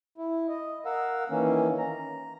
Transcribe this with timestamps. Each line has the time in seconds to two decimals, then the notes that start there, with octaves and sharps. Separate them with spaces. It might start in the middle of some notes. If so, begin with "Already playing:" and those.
0.18 E4
0.49 D#5
0.85 A#4 F5 F#5 E6
1.30 D#3 E3 A#3 C#4
1.78 A#5